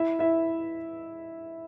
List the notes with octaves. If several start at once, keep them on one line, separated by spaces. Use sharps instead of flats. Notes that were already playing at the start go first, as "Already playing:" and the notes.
Already playing: E4 E5
E4 E5